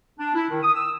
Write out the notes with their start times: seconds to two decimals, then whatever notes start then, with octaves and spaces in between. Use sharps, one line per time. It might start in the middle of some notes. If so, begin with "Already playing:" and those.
0.19 D4
0.35 E4
0.51 D#3
0.63 D#6
0.75 E6